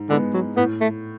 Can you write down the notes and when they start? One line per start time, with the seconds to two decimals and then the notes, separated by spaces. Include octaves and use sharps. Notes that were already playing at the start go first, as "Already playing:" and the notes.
Already playing: G#2
0.09 D3 G#3 B3
0.34 F#3
0.56 A2 B3
0.80 A3